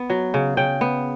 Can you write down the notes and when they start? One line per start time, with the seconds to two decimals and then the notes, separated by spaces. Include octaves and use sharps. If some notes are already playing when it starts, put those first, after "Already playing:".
Already playing: B3
0.10 F#3
0.34 C#3
0.57 C#3 G5
0.81 B3